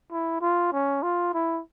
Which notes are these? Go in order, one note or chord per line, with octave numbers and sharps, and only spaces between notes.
E4
F4
C#4
F4
E4